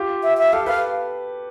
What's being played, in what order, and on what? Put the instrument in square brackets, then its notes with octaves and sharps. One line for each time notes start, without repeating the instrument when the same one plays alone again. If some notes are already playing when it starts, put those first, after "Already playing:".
Already playing: [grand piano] F4 G4
[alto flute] E5
E5
[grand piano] G4 A4 [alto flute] F5
[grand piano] A4 B4 [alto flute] F5